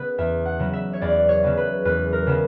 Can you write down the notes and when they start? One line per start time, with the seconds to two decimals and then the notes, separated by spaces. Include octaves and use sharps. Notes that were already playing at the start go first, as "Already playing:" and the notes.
Already playing: C#3 B3 B4
0.18 E2 E5
0.45 F#5
0.59 C#3 F#3 B3
0.73 E5
0.93 C#5
1.01 E2 D5
1.29 C#5
1.44 C#3 F#3 B3
1.58 B4
1.85 E2 B4
2.13 A#4
2.27 C#3 F#3 B3